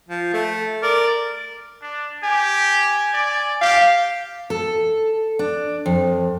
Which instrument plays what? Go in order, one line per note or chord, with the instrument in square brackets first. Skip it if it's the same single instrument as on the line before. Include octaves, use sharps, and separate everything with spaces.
[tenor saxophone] F3
A3
[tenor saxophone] A#4 [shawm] D5
[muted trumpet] D4
[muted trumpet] G4 [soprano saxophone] G#5
[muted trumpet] D5
[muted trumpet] G4 [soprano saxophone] F5
[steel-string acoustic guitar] A4
D4
F2